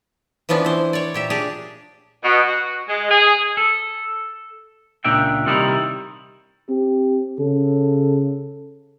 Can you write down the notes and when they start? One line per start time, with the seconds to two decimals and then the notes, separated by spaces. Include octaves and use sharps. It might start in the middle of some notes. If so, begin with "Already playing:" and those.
0.49 E3 F3 B3 C#4 D4
0.64 E4 C5
0.93 C#5 D5
1.14 A#2 G4 E5
1.30 D4 G4 G#4
2.24 B2
2.48 F#4
2.89 G#3
3.10 G#4
3.57 A4
5.04 C#2 A#2 D4 A#4 E5 G5
5.46 C3 D#3 G3 D#4 E4
6.69 C4 G4
7.39 C#3 A4